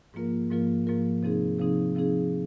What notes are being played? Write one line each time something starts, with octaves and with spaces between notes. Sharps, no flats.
G#2 F3 A#3 F4 A#4
G#2 F3 A#3 F4 A#4
G#2 F3 A#3 F4 A#4
C3 F3 C4 D#4 G#4
C3 F3 C4 D#4 G#4
C3 F3 C4 D#4 G#4